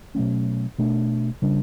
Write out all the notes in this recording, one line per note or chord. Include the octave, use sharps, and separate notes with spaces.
B2 F#3 A3 C#4
B2 A3 D4
C#3 G3 D4